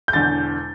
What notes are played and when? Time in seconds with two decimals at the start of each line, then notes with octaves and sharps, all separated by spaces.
0.08 G6
0.13 E1 E2 D3 A6